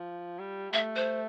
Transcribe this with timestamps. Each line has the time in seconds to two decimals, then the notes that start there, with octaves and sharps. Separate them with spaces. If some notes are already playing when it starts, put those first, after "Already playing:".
Already playing: F3
0.39 G3
0.73 A3 E5
0.96 C5